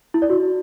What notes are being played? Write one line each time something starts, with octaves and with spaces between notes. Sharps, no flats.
E4
D5
F#4